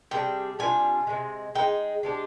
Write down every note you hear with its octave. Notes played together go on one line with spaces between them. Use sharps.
C3 G3 D4 G#4 G5
C3 G3 D4 F4 G#5
C3 D#3 G#3
G#3 D#4 G#4 G5
G#3 D4 G4